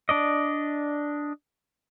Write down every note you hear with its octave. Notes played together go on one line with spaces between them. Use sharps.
D4 D5 D#5